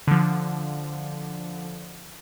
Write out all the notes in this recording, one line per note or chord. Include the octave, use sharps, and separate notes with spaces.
D3 F3